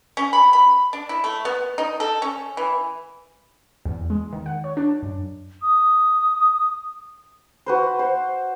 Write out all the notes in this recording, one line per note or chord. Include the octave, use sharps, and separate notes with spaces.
C#4
B5
B5
D4
E4
A3
B3
D#4
A4
C#4
E3
E2
G#3
D#3
F#5
C#5
D4
F#2
D#6
F#4 B4 C5
C5